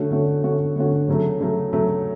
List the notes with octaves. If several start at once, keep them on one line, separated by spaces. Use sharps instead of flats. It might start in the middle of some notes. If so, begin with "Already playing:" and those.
Already playing: D3 A3 C#4 F#4
D3 A3 C#4 F#4
D3 A3 C#4 F#4
D3 A3 C#4 F#4
C#3 F#3 A3
C#3 F#3 A3
C#3 F#3 A3